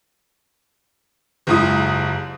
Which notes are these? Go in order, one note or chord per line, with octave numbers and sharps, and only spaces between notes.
F#1 G#2 E4 F4 G4 D#6